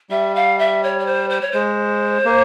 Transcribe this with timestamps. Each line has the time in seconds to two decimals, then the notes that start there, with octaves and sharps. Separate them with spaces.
0.10 G3 E5
0.35 F5
0.58 E5
0.83 C#5
0.99 C#5
1.06 C5
1.29 C5
1.41 C#5
1.51 G#3 C5
2.25 A#3